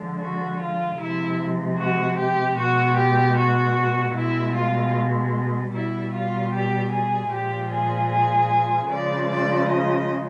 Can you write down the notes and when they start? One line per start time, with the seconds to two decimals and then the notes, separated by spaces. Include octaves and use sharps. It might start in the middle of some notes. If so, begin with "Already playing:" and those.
Already playing: D3 F3 G#3
0.20 F#4
0.60 F4
0.99 C3 F3 G#3 E4
1.78 F#4
2.17 G4
2.57 B2 G#3 F#4
2.97 G4
3.36 F#4
4.14 B2 G#3 E4
4.55 F4
5.72 B2 G3 E4
6.13 F4
6.52 G4
6.91 G#4
7.31 A#2 F3 G#3 G4
7.70 G#4
8.09 G#4
8.89 C#3 F3 G#3 D5
9.29 D5
9.68 D#5